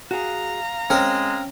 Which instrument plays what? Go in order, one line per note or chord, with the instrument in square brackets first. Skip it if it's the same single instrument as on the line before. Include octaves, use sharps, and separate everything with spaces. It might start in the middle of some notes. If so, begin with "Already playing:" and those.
[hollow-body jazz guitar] F#4 G#4 [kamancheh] F5 A#5
[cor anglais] G#3 [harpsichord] C4 A#4 [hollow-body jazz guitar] C#4